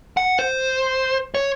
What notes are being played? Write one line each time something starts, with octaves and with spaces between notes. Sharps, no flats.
F#5
C5
C#5